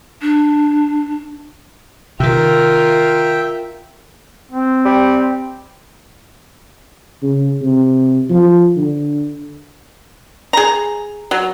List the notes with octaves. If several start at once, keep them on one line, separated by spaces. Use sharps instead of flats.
D4
C3 D#3 F4 A#4 E5 G5
C4
G3
C#3
C3
F3
D3
G#4 A#5
F#3